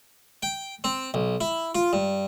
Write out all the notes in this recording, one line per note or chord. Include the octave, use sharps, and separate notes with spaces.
G5
C4
B1
E4
F4
G2